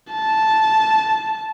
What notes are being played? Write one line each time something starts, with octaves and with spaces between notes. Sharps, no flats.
A5